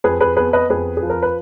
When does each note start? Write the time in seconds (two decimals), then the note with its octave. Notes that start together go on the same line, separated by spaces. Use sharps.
0.04 F2 G#4 B4
0.20 G#4 B4
0.37 B3 G#4 B4
0.53 B4 D#5
0.70 F2 G#4 B4
0.97 G#4
1.03 F3
1.10 A#4
1.22 B4